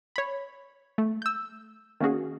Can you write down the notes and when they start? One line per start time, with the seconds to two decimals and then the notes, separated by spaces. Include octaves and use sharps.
0.16 C#5 B5
0.98 A3
1.22 E6 G6
2.00 D#3 A#3 C#4 F#4 G#4